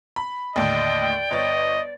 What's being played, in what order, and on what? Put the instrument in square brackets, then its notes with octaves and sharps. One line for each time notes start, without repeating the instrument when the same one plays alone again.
[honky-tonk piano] B5
[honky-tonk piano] D#2 A2 D3 [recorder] D5 [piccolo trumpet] D#5 [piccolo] G5
[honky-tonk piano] G1 C#5 A6 [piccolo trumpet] D#5